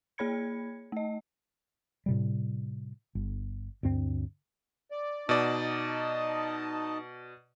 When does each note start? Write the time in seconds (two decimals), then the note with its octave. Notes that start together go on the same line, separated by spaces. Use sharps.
0.18 A#3 G#4 C#5 B5 G#6 C#7
0.92 A3 D#5
2.06 A2 C3 G3
3.15 G1
3.83 D2 G2 C4
4.91 D5
5.29 B2 D#4 D5 D#5 A5